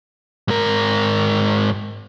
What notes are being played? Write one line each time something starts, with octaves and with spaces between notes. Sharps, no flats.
G#2 A#4